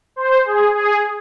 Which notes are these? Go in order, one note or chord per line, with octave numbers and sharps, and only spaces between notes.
C5
G#4
G#4